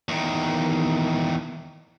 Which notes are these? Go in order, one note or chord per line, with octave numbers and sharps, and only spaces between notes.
E2 D#3